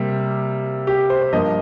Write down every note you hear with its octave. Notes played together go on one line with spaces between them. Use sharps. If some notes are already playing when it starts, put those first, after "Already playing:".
Already playing: C3 G3 A#3
G4
C5
C5
G2 F3 A#3 D#5